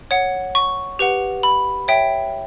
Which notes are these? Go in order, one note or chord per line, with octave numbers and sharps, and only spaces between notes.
C#5 F#5
C#6
G4 B4 F#5
B5
C#5 E5 G5